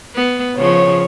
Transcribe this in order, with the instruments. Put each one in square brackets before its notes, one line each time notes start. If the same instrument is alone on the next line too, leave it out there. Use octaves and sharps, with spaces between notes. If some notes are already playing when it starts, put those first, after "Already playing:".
[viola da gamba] B3
[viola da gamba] C#3 F3 [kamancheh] C#5